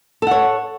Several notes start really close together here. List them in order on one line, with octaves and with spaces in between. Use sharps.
A4 F#5 C#5